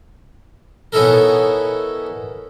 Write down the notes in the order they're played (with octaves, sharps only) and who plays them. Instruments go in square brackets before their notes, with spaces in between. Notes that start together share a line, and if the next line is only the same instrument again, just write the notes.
[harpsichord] B3 C#4 D#4 E4 A4 A#4